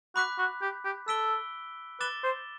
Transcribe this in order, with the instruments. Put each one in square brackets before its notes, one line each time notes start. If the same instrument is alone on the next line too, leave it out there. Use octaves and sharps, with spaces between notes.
[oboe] F#4 [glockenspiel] B5 D6 F#6 B6
[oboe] F#4
G4
G4
[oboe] A4 [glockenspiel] E6 B6 D7 G7
[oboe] B4 [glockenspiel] D6 A6 E7 G7
[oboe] C5